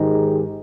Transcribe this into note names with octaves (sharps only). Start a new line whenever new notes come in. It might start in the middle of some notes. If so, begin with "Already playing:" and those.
Already playing: G#2 D#3 G#3 D#4 G4